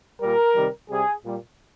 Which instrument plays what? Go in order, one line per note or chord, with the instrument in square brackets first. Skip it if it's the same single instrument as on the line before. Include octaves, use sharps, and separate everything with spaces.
[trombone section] A#2 G3 A#4
C3 D#3 G3
C3 G3 G#4
A#2 G3